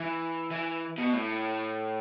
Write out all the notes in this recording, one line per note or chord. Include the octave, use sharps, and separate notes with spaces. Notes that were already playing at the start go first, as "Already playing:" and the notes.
Already playing: E3
E3
B2
A2